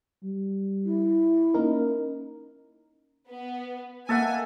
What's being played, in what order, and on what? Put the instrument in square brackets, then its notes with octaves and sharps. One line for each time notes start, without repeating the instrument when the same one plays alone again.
[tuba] G3
[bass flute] E4
[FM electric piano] A#3 D#4 A#4 [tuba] C#4
[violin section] B3
[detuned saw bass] A#3 [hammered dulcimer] A4 E5 F#5 [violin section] G#5